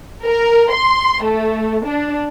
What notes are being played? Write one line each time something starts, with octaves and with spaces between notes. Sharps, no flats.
A#4
C6
A3
D4